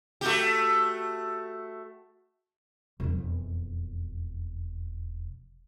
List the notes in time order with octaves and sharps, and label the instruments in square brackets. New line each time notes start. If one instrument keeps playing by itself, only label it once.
[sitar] A3 F#4 G4
[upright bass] E1 F2